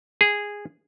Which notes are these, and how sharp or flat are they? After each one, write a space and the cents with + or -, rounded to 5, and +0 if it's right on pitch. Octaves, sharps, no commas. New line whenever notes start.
G#4 -10